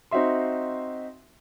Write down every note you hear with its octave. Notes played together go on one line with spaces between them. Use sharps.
C4 D#4 F#4 E5 C6